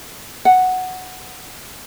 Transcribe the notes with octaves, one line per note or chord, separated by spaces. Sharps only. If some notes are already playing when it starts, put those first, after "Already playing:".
F#5